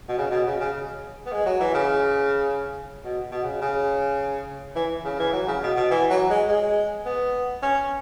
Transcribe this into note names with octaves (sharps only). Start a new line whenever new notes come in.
B2
C#3
B2
C#3
C#3
B3
G#3
F#3
E3
C#3
B2
B2
C#3
C#3
E3
C#3
E3
F#3
C#3
B2
B2
E3
F#3
G#3
G#3
B3
C#4